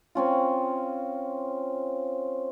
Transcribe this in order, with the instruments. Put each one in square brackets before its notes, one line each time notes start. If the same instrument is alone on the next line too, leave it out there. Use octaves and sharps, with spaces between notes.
[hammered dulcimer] C4 C#4 F4